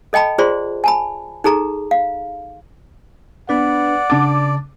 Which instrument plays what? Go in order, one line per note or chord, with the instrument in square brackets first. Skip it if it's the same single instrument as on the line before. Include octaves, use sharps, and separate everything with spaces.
[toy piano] A4 D#5 G5 A5 B5
F4 G#4 C5 D5 C6
G#5 A5 B5
D#4 G#4 A4 A#5
F5
[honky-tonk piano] B3 [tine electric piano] D4 B4 [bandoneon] D5 [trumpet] F#5
[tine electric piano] C#3 A5 A6 [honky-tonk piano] D4 D6